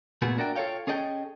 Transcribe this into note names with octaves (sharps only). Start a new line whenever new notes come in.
A#2 A3 B3 F4 F#4 G#4
D4 F#4 A#4 D5 E5 G5
F4 A4 C5 C#5 F5 G5
C#4 G#4 A4 D#5 F#5 G5